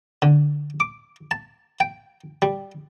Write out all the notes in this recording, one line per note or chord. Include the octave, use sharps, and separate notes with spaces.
D3
D6
A5
G5
G3